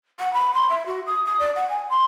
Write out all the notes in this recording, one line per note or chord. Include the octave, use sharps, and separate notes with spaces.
F#5
B5
C6
E5
F#4
D#6
D#6
D5
F#5
G#5
C6